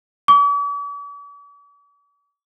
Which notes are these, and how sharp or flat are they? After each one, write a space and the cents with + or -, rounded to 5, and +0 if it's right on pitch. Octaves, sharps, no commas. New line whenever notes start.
D6 -45